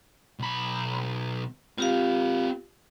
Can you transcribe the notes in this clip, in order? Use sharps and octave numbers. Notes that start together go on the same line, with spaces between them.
B1 B5
C4 F4 G4 A#4 F5